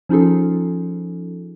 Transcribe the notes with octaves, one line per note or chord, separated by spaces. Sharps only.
F3 C#4 D#4 F4 G#4 A4